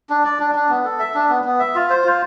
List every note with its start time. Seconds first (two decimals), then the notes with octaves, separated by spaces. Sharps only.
0.10 D4
0.25 D5
0.39 D4
0.55 D4
0.69 B3
0.84 A4
0.99 E5
1.14 D4
1.29 B3
1.44 B3
1.59 E5
1.75 F4
1.90 C5
2.04 F4